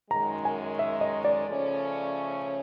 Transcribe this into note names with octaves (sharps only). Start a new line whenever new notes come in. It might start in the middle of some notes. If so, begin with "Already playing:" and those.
F#2 D#3 G#3 A#5
G#5
E5
D#5
D5
C#3 F3 A3 C#4